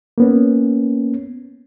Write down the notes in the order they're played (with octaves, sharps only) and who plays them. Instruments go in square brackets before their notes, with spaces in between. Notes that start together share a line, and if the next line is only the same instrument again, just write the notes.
[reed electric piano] A#3 B3 C#4